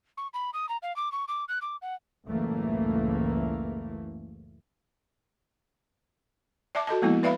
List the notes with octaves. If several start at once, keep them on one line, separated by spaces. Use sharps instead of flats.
C#6
B5
D#6
A#5
F5
D6
C#6
D6
F#6
D6
F#5
F#1 C#2 A2 E3 A3 A#3
D5 E5 A5 D6
F#4 A4 D#5 A5
F3 G#3 A#3 B3 E4
B4 D5 E5 F5 B5